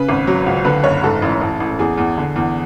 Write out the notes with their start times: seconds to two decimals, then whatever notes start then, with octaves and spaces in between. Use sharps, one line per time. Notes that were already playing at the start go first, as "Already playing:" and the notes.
Already playing: C#3 B4
0.09 G#1
0.27 F#3
0.46 C#2
0.65 D3 B4
0.84 F#1 C#5
1.03 G#2 A4
1.22 A1
1.41 A1
1.60 A1
1.79 E2 G#4
1.98 E2
2.18 D3
2.36 E2